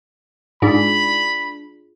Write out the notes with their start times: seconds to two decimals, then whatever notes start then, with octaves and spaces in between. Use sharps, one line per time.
0.62 G#2 D4 F4 G#4 B5